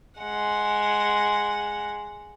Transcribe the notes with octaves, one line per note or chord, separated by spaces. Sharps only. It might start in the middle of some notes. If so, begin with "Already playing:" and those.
G#3 F#5